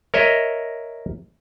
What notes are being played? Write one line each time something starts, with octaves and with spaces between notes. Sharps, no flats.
A#4 C#5 D#5 E5